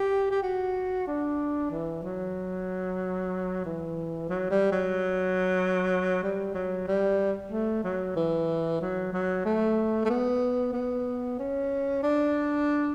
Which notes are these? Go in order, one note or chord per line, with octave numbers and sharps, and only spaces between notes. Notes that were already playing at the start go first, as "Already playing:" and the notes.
Already playing: G4
G4
F#4
D4
E3
F#3
E3
F#3
G3
F#3
G3
F#3
G3
A3
F#3
E3
F#3
F#3
A3
A3
B3
B3
C#4
D4